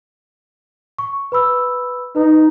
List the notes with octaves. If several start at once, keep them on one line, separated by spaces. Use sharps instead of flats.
C#6
B4 B5 E6
D#4 B4